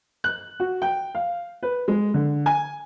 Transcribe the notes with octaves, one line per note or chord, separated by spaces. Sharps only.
F#6
F#4
G5
F5
B4
G#3
D3
G#5